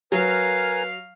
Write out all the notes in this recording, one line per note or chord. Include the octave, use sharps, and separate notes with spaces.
F#3 A#4 B4 F5 G#5